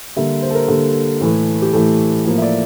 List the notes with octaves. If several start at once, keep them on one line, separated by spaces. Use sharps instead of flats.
D3 G3 A#3 E5
C5
A4
A#4
D3 G3 A#3 A4
A2 E3 A3
G4
A2 E3 A3 A4
A2 F3 A#3
E5
D5